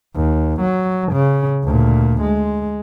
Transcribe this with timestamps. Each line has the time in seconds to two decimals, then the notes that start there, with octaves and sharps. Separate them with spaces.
0.16 D#2
0.61 F#3
1.13 C#3
1.65 D2 A#2
2.21 G#3